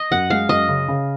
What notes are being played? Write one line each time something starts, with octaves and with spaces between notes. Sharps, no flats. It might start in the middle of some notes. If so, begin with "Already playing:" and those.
Already playing: D#5
F#2 F#5
G#3 F5
F#2 D#5
C#3
C#3